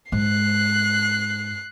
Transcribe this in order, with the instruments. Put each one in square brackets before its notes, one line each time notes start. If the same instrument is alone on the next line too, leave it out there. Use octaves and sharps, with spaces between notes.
[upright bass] G#2 [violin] F#6 C7